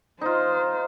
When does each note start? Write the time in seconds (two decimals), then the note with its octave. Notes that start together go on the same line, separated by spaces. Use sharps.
0.21 D#4 F4 C5